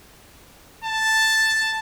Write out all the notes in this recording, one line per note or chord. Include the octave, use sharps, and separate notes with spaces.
A5